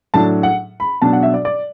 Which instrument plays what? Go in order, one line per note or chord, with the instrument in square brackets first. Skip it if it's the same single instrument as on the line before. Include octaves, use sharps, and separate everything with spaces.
[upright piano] A2 F#3 D4 A5
F#5
B5
B2 F#3 D4 A5
F#5
E5
D5
D5